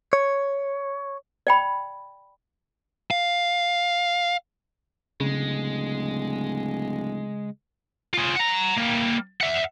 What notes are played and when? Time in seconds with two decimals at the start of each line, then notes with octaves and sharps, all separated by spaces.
0.13 C#5
1.47 D5 G5 B5
3.11 F5
5.20 D1 C#3 G#3
8.14 F4 G#4
8.36 F#5 A#5
8.78 G3 A#3
9.41 E5 F#5